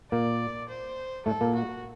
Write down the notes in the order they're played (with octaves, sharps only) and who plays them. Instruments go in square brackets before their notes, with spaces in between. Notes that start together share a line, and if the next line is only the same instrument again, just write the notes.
[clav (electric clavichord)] A#2 A#3 [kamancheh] D5
[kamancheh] C5
[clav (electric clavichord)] A2 A3 [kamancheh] A4
[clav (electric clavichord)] A#2 A#3
[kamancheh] F#4